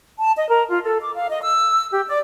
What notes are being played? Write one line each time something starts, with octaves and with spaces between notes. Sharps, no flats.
A5
D#5
A#4
F4
A4
D6
F5
D#5
E6
G4
D5